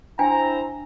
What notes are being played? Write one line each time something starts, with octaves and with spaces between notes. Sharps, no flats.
D4 E4 C5 G5 G#5 A#5